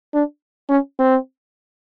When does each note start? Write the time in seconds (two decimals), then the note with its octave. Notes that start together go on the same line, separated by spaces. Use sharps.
0.14 D4
0.69 C#4
0.99 C4